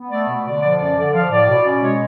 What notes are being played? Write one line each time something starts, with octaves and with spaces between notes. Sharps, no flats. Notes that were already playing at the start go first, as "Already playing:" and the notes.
Already playing: B3
A3 D5
B2
D3 D5
F3 D5
F#2 D5
D3 D5
F3 F5
A2 D5
B2
C#4
G#3 C#5